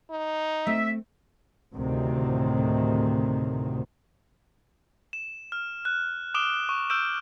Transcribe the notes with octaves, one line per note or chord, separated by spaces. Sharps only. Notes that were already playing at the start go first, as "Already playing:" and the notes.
D#4
A3 C4 E5
D2 A2 C3 D#3
E7
F6
F#6
D6 D#6 D7 E7 G7
C#6
E6 F6 G6 D7 E7